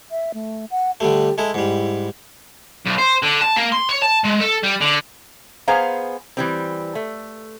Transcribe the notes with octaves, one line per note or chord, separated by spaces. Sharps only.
E5
A3
F#5
D3 G3 A3 G4
G#3 E4 A4
G#2 G3 E4
B1
C5
D3
A5
A#3
C6
C#5
A5
G#3
A4
G3
D3
B3 G#4 C5 F5 G#5 A#5
E3 G3 C4
A3